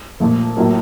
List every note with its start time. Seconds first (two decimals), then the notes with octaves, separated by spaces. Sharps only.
0.20 A#2 F3 A3
0.57 A2 F#3 A#3